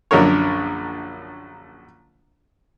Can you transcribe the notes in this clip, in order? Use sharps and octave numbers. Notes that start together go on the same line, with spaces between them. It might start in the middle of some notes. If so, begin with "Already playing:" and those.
A#1 F#2 D3 A#3 A#4 C#5